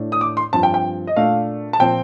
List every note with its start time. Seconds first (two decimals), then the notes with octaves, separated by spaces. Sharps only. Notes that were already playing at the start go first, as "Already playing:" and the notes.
Already playing: A2 A3 D4
0.12 D#6
0.21 D6
0.37 C6
0.53 G2 F3 C4 A5
0.63 G5
0.74 G5
1.07 D#5
1.16 A#2 A3 D4 F5
1.73 A5
1.80 A#2 F3 C4 G5